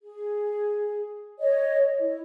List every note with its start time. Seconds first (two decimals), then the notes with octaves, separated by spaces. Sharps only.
0.02 G#4
1.40 C#5 D#5
1.99 E4